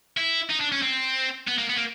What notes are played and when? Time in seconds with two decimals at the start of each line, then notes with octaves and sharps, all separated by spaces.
0.17 E4
0.50 D#4
0.61 D4
0.72 C#4
0.82 C4
1.47 B3
1.58 A#3
1.69 B3
1.76 A#3